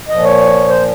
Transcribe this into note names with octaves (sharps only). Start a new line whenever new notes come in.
A#2 F3 D#5
C#5
C5